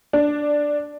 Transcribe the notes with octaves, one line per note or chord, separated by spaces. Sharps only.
D4